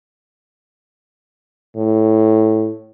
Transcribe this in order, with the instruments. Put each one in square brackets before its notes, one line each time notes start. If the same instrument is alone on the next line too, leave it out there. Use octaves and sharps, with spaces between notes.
[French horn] A2